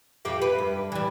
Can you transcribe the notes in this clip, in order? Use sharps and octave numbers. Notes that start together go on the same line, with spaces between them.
F2 G4 F5
B4
G2
E3 G3